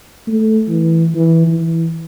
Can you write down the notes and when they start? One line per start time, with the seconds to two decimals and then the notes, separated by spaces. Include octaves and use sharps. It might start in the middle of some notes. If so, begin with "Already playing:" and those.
0.28 A3
0.68 E3
1.15 E3
1.47 E3